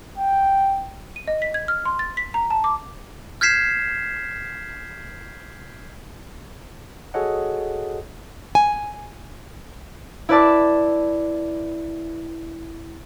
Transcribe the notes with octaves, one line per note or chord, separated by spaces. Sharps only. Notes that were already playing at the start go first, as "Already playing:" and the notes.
G5
D#7
D#5
B6
G#6
F6
C6
A6
B6
A#5
A5
D6
F6 G6 G#6 B6 C7 E7
F#4 G#4 A4 C#5 D#5 F#5
G#5
E4 B4 D5 A5 E6